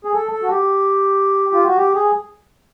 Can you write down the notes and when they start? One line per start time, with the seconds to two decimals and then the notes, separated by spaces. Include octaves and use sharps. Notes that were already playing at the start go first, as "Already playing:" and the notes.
0.05 G#4
0.14 A4
0.32 A4
0.42 F#4
0.50 G4
1.53 F4
1.66 F#4
1.77 G4
1.95 G#4